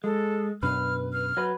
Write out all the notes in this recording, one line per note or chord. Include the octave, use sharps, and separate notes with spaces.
G#3 A4
F#2 B2 D4 B4 F6
F6
F#3 B4